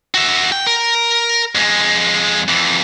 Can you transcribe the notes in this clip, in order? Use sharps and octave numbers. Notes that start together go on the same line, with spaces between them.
F#4 E5
G5
A#4
F2 G#3
F2 E3